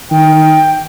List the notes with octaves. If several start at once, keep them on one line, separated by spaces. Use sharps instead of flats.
D#3 G5